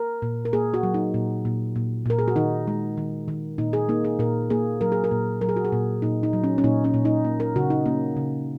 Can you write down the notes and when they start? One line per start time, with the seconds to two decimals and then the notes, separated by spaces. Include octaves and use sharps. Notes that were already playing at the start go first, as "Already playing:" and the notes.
Already playing: A#4
0.22 A#2
0.45 A#4
0.53 A#3 G#4
0.74 F#4
0.83 F#3
0.94 D#4
1.14 A#2
1.45 A#2
1.76 A#2
2.06 A#2 A#4
2.19 G#4
2.28 F#4
2.36 D#3 D#4
2.68 G#3
2.97 D#3
3.28 D#3
3.58 A#2 D#4
3.73 G#4
3.89 A#3 D#4
4.05 G#4
4.19 A#2 A#4
4.50 A#3 G#4
4.81 F#3 A#4
4.92 G#4
5.04 A#4
5.11 A#2
5.41 F#3 A#4
5.49 G#4
5.56 F#4
5.65 G#4
5.72 A#2
6.02 A#2 D#4
6.23 D#4
6.33 F#3
6.44 C#4
6.58 C#4
6.64 A#2 D#4
6.84 C#4
6.94 A#2
7.05 D#4
7.25 A#3
7.40 A#4
7.56 C#3 F#4
7.70 D#4
7.86 A#3 C#4
8.17 C#3